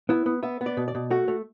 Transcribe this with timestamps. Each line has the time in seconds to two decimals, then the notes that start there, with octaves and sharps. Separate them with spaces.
0.09 B3 E4
0.26 B3
0.43 B3 E5
0.61 B3
0.66 D5
0.77 B2
0.88 D5
0.95 B2
1.10 A3 F#4
1.28 A3